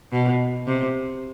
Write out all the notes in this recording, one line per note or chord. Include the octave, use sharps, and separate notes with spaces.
B2
C3